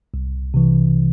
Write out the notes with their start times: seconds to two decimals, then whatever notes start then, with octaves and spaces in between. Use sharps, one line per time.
0.14 C2
0.54 C3 E3